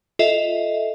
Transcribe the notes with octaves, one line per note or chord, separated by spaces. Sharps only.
F4 A4 D#5 E5